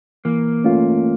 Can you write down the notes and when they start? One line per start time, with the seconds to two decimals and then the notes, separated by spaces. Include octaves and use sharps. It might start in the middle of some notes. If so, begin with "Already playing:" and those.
0.25 E3 A#3
0.64 A3 C#4 F4